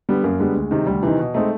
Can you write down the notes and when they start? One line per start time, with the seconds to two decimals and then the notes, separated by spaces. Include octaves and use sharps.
0.09 D3 G3 B3
0.24 F#2 A#3
0.40 D3 G3 G#3 B3
0.55 D2
0.71 C3 D#3
0.87 D2 G3
1.03 C3 D#3 E3
1.19 B2
1.34 G#3 A3 C4 D#4